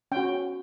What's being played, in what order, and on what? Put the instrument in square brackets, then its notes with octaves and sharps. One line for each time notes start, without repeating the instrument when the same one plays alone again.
[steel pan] C#4 F#4 G5